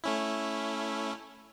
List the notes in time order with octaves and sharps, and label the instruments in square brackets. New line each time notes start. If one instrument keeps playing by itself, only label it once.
[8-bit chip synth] A3 C#4 E4